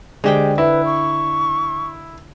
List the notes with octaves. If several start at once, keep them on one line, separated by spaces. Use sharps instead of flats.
D3 G#3 G4 C5 G5
E4 B4
C#6